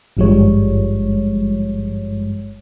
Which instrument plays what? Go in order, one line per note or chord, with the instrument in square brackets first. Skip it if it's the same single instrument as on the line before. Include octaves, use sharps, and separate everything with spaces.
[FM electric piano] G#1 G2 F3 G3 G#3 C#5